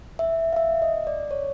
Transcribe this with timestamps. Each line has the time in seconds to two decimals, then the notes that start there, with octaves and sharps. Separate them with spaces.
0.19 E5
0.53 F5
0.56 E5
0.82 D#5
1.07 D5
1.31 C#5